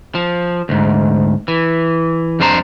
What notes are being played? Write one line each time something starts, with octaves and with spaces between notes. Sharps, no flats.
F3
D2 G#2
E3
F2 G3 D4 C5 A#5